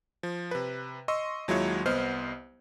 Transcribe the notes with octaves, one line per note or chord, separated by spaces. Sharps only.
F3
C3 B4
D#5 C6 C#6 E6
D#2 F#3 G#3 E4 F4 C#5
C2 B3 C5 D#5 F6